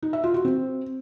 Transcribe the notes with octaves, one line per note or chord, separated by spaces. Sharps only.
D#4
E5
F4
F#4
C4